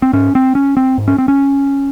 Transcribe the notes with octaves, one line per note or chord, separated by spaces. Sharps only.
C4
G#2 C#4
C4
C#4
C4
G#2
C#4
C4
C#4